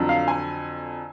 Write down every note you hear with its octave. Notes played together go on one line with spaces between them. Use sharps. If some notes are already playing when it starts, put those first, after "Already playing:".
Already playing: F2 D3 F#3
F5
G#5